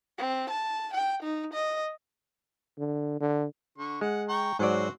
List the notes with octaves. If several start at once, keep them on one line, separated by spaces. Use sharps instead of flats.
C4
A5
G5
D#4
D#5
D3
D3
D3 C#6
G#3 F#5
G5 A#5 C#6
G#2 F#3 C4 F#4 C5 D5